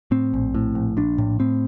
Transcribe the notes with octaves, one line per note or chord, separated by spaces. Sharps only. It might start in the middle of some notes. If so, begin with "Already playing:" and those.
A2 C4
A#1
A2
A#1
A#1 D4
A2
A2 C4